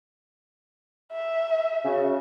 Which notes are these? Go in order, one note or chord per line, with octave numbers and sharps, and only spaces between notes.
E5
C#3 F#4